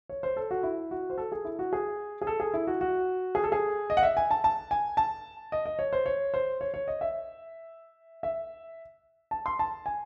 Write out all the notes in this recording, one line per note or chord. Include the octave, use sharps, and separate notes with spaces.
C#5
C5
A4
F#4
E4
F#4
C5
A4
G#4
E4
F#4
G#4
G#4
A4
G#4
E4
F#4
F#4
G#4
A4
G#4
D#5
F#5
E5
G#5
A5
A5
G#5
A5
D#5
D#5
C#5
C5
C#5
C5
C#5
C#5
D#5
E5
E5
A5
C6
A5
G#5